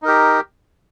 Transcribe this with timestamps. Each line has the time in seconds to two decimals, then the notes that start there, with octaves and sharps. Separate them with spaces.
0.02 D#4
0.05 A#4
0.08 G4